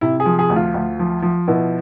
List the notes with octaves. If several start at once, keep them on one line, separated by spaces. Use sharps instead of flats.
C3 E4
G#4
F3
G#4
D2
F4
D2
F3
F3
B2 E4